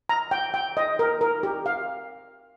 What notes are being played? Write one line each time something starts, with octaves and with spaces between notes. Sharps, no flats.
A#5
G5
G5
D#5
A#4
A#4
G4
F5